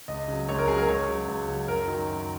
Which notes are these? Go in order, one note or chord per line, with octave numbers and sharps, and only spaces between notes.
C#2 D#5
C#3 F#3
C#2 C#5
A#4
C#3 F#3 G#4
A#4
C#2 C#5
C#3 F#3
C#2
C#3 F#3
F#2 A#4
D#3 F#3
F#2